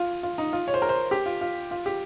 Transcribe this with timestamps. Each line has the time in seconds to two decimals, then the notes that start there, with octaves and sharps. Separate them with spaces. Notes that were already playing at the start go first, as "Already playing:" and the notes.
Already playing: F4
0.23 F4
0.38 D#4
0.53 F4
0.68 C#5
0.74 C5
0.82 A#4
0.89 C5
1.11 G4
1.26 F4
1.41 F4
1.71 F4
1.86 G4